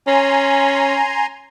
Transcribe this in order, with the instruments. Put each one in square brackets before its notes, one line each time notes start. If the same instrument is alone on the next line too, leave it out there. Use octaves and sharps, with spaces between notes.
[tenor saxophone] C#4 [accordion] G#5 A#5 C6